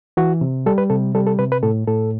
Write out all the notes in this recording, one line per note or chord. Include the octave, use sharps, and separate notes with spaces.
E3 F#4
C3
G3 A4
B4
C3 A4
G3 A4
A4
C3 B4
B4
A2 A4
A2 A4